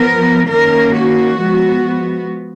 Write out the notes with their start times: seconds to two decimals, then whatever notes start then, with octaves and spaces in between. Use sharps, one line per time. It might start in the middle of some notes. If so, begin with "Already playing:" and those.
Already playing: F3 B3 A#4
0.48 D#3 A#3 C#4 A#4
0.94 F#4
1.40 F3 G#3 B3